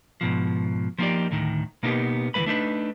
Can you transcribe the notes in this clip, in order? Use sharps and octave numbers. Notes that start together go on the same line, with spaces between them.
G#2 B2 F3
F3 A#3 D#4 F4 G4 D5
D2 A2 D#3
B2 A#3 B3 D#4 F#4 G4
D2 E3 F#3 A3 B4 B5
A3 D4 D#4 B4